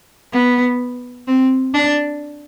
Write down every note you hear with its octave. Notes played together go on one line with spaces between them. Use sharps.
B3
C4
D4